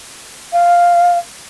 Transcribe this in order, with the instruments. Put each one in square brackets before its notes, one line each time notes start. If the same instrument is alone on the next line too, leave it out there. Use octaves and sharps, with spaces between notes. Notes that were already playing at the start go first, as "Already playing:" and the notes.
[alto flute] F5